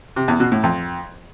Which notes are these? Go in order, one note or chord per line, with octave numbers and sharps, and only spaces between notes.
C3
E2
B2
A2
F2